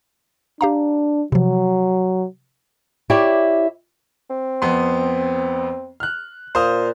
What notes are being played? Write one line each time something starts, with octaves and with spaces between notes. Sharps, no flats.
D4 G4 F5 A#5
C3 F3 F#3
E4 G4 C#5 D5
C4
F2 B3 C6
F6 F#6
A#2 C5 F5 D#6